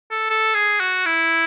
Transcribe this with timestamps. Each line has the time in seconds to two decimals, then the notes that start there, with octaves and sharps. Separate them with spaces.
0.11 A4
0.30 A4
0.54 G#4
0.80 F#4
1.06 E4